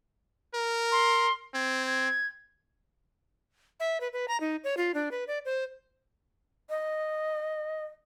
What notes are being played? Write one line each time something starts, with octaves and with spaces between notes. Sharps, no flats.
A#4
C6
C4 G#6
G#6
E5
B4
B4
A#5
D#4
C#5
F4
D4
B4
D5
C5
D#5